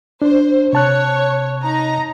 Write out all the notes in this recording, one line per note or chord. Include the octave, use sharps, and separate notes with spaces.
D4 C5
C3 C#5 A5 F#6
D#4 A#5